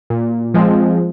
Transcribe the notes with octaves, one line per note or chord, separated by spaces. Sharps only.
A#2
F3 G#3 C4